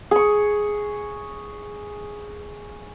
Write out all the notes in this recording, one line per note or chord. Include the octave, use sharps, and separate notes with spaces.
G#4 C#6